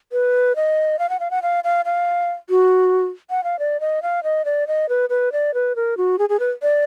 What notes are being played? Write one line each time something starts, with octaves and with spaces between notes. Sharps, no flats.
B4
D#5
F5
F#5
F5
F#5
F5
F5
F5
F#4
F#5
F5
D5
D#5
F5
D#5
D5
D#5
B4
B4
D5
B4
A#4
F#4
G#4
G#4
B4
D5